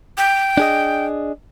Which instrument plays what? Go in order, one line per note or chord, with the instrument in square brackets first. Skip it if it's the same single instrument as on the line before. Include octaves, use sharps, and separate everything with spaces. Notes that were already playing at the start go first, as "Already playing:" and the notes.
[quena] G5
[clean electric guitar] D4 G#4 D#5